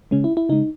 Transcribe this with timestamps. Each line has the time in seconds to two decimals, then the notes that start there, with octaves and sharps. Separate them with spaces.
0.11 C#3 G#3 C#4
0.24 E4
0.37 E4
0.49 C#3 G#3 D#4